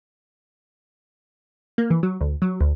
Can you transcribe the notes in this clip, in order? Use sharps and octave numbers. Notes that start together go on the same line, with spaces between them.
A#3
E3
F#3
D2
F#3
D2